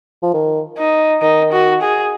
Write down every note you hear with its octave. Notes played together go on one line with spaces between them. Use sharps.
F3
D#3
D#4
D#3 D#4
F#4
G#4